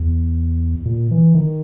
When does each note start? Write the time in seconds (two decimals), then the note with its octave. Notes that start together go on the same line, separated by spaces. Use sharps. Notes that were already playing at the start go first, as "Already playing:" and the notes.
Already playing: E2
0.85 A#2
1.11 E3
1.35 D#3